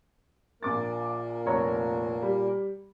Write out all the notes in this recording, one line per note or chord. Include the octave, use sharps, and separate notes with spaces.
A#1 A#2 A#3 A#4 D6 A6
F1 C#5 A#5
G3